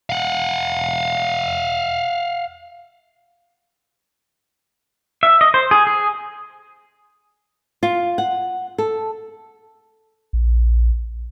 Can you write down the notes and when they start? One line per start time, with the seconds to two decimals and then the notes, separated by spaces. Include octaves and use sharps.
0.10 F5 F#5
5.23 E5
5.41 D#5
5.54 C5
5.71 G#4
5.87 G#4
7.83 F4
8.18 F#5
8.78 A4
10.33 A#1